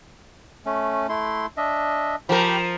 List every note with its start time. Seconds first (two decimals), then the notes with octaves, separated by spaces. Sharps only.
0.66 A3 C#4
1.09 A3 E4 C6
1.57 D4 D#5 E5
2.29 F3 G4 A#4 G5 B5